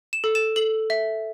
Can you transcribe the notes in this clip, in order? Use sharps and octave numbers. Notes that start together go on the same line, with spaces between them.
E7
A4
E7
A4 F#7
E5